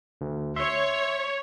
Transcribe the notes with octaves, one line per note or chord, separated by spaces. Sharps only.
D2
C#5 E5 C6